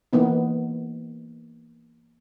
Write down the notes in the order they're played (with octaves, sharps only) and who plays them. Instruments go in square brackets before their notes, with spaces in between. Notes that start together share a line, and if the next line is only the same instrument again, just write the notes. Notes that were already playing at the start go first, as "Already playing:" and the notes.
[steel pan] E3 A#3 B3 D#4